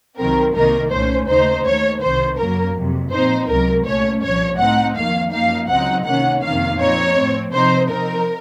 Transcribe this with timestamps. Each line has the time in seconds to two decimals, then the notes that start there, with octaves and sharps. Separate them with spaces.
0.17 C2 C3 D#3 F#3 C4 A#4
0.54 C2 C3 D#3 A#3 D#4 A#4
0.91 C2 A#2 A3 C#4 C5
1.27 D#2 C#3 A3 D#4 C5
1.64 D#2 D#3 A3 C#5
2.01 C2 C3 D#3 C5
2.38 F#2 C#3 F#3 A#3 A#4
2.75 F2 C3 F#3
3.11 A#2 F3 C4 D#4 C5
3.48 C#2 C3 F#3 A#4
3.85 C2 A#2 A3 C#4 C#5
4.22 C2 A#2 F3 C#5
4.59 A2 A3 C4 D#4 F#5
4.96 F2 D#3 A#3 F5
5.32 F#2 F3 A#3 D#4 F5
5.69 C#2 C#3 F#3 C4 D#4 F#5
6.05 C3 D#3 A#3 C#4 F#5
6.42 F2 C3 D#3 A#3 F5
6.79 A#2 F3 C4 D#4 C#5
7.16 A2 F3 C4
7.52 C3 F3 C4 D#4 C5
7.89 C3 F3 C4 D#4 A#4